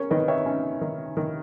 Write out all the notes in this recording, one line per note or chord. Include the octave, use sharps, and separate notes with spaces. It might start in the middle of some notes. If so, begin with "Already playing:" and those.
Already playing: C#4 A#4 C#5
D#3 B4 D#5
C#5 E5
C#4
D#3
D#3